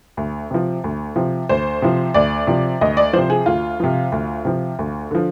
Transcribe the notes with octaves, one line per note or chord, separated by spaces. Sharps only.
D2
C3 F3
D2
C3 F3
D2 C5
C3 F3
D2 D5
C3 F3
D2 D#5
D5
C3 F3 C5
G#4
D2 F4
C3 F3
D2
C3 F3
D2
D3 F3